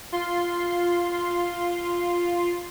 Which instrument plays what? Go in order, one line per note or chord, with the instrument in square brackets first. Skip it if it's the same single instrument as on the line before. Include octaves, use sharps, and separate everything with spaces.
[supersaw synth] F4 C6